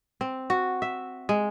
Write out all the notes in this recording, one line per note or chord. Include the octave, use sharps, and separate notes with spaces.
C4
F#4
E5
G#3